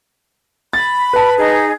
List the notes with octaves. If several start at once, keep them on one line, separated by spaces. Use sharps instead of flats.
B5 A6
B4 A5
D#4 G#4